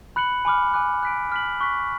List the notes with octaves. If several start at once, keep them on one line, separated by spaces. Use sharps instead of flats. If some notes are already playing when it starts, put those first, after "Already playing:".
B5 F#6 C#7 F#7
G#5 B5 D6 F6
G#5 D6 F#6
F#6 B6 D7
F6 B6 F#7
C#6 F#6 B6